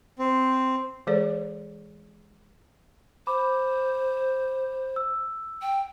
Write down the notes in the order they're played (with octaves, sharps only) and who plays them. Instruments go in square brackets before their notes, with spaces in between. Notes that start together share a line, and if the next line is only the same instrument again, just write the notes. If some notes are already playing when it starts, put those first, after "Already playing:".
[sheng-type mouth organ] C4
[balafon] E3 G#3 G#4 A4 C5 D5
[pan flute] C5 [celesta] B5 D6
[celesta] E6
[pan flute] G5